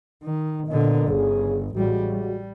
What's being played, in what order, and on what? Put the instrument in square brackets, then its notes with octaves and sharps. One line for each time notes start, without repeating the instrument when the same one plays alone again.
[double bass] D#3
[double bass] A#2 D3 [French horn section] B3 A#4 D#5
[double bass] G1 [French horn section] C#3 G#4
[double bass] A1 G3 [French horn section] C#3 G#3 F#4
[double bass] G3